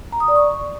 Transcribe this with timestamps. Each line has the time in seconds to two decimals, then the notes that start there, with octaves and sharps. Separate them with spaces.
0.12 A#5
0.20 D#6
0.28 D5
0.36 C#6